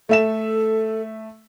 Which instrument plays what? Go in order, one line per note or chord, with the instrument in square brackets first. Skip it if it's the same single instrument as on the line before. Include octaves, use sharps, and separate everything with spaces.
[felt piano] A3 E5 E7 [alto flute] A4